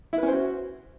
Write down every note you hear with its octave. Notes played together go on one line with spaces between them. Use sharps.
E4
B4
C#4
C5
F#4